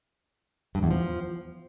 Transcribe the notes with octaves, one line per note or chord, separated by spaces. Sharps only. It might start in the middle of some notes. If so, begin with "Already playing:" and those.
G2
E2
F3